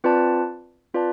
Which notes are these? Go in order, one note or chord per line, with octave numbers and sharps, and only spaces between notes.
C4 F4 B4 D5 A5
C4 F4 B4 D5 A5